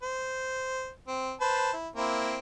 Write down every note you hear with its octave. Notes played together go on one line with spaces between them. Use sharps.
C5
C4
B4 C5 A5
E4
A#3 C4 E4